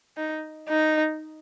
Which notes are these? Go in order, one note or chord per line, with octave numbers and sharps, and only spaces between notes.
D#4
D#4